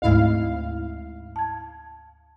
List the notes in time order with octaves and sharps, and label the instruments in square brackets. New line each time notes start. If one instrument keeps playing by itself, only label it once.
[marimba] D2 A3 [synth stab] G#2 E4 F5
[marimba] A5 G#6